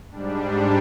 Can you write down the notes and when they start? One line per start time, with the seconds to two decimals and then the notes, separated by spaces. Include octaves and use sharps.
0.10 G#2 G3 D4